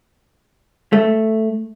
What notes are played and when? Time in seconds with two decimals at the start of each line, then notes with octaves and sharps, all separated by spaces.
0.93 A3